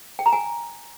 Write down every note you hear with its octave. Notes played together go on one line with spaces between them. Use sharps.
G5
A#5
G#5